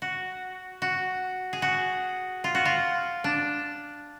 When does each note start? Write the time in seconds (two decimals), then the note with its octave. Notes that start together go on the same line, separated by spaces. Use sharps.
0.02 F#4
0.82 F#4
1.53 G#4
1.62 F#4
2.44 F4
2.55 F#4
2.65 F4
3.24 D4